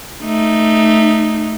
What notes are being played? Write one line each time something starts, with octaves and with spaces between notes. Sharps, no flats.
A3 D#4